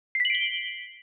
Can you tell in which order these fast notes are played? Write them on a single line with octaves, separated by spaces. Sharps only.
C7 B6 F#7 D7 G7